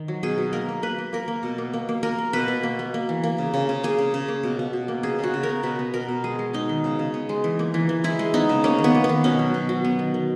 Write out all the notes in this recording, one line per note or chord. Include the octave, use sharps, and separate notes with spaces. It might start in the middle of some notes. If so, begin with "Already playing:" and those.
Already playing: D#3
F#3
B2 G#4
B2
A#3 A#4
A#3
A#3 B4
A#3
A#3 A#4
A#3
B2
A#3
A#3
A#3
A#3 A#4
A#3
B2 B4
B2
A#3
A#3
A#3
E3
A#3
C#3
C#3
C#3
A#3 G#4
C#3
C#3
A#3
B2
B2
B2
A#3
C#3 G#4
C#3 F#4
C#3
A#4
B3
B2 B4
B3
B2 A#4
B2
G#3 G#4
G#3
G#3 D#4
D#3
C#3
C#3
B3
G#3
E3
A#3
E3
E3
G#3 E4
G#3
B3 D#4
C#3
A#3 C#4
D#3
B3
A#3
B3
D#3
B2 C#4
F#3
B2
F#3
B3
D#3
D#3